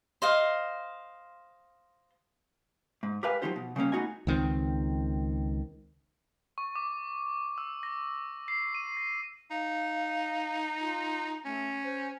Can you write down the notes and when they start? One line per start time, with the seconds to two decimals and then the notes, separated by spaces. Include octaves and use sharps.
0.22 C5 D#5 F5
3.03 G#2
3.23 G4 A#4 B4 F5 G#5
3.42 F3 F#3 G#3 D#4 G4 C5
3.56 B2
3.76 C#3 G3 A#3 C#4
3.92 A3 B3 D#4 F#4 D#5 G#5
4.27 C#2 D#3 C4
6.58 C#6
6.76 D6
7.58 E6
7.83 A#6
8.48 C7
8.75 D#7
8.97 A#6
9.51 D#4 F5
10.80 F4
11.45 A3 C#4
11.84 C5